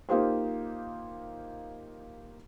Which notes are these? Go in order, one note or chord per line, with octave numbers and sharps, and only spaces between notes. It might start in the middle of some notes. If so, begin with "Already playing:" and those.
A#3 D#4 F4 G4 C5